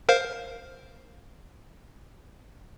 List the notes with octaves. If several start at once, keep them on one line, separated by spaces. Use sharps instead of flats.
A#4 C5 F5